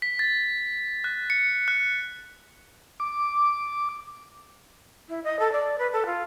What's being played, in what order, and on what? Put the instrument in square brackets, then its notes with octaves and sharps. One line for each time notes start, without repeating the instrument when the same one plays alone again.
[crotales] B6
A6
F#6
C#7
F#6
[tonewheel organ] D6
[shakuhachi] E4
D#5
A4
D5
B4
A4
F4